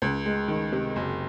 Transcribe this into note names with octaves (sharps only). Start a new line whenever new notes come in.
C#2
G#3
D#3
C3
F#1